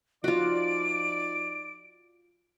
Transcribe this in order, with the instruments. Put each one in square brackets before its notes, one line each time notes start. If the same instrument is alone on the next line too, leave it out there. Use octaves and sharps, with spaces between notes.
[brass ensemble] F3 D#4 D5 [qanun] F4 F#4 [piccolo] D7